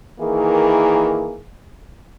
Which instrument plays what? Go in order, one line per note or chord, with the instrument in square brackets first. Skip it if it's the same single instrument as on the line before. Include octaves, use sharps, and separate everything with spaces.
[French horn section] D#3 E3 A#3 E4 G#4